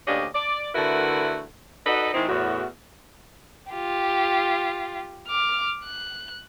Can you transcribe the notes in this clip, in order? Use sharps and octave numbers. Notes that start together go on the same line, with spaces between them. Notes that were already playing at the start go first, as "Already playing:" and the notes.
D2 A#3 C#4 D4 G4 D#5
D5
D3 A3 E4 F#4 A#4 B4
D#4 F#4 A4 B4 D5 D#5
D#3 G#3 C4 D#4 E4
E2 A2 F#4
F4 G4
D6 F6
F#6